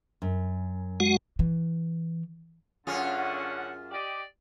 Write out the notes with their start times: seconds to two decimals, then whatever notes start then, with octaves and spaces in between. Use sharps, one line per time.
0.22 F#2
1.00 G#3 F#4 F#5
1.39 E3
2.87 F#2 D3 C#4 F4 G#4 F#5
3.91 G4 D5 D#5